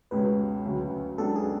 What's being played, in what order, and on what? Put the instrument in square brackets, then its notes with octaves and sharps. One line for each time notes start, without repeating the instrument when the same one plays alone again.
[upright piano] C#2 B2 G#3 C#4 [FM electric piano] B4
[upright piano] D2 C#3 F#3
[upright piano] C#2 C#3 F#3 B3 D4 [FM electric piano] A4
[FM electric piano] G#4